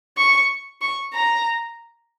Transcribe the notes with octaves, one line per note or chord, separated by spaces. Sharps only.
C#6
C#6
A#5